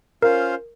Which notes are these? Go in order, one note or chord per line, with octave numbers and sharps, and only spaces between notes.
C#4 F4 A#4 C5 F5